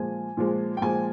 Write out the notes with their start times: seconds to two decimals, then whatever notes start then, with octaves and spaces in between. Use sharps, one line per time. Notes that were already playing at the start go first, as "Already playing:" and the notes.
Already playing: A#2 F3 G#3 G#5
0.37 A#2 F3 G#3
0.77 G5
0.81 A#2 F3 G#3 G#5